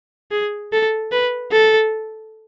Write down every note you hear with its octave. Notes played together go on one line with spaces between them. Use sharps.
G#4
A4
B4
A4